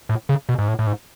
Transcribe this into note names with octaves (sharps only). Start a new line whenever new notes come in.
A2
C#3
B2
G#2
A2
A2
G#2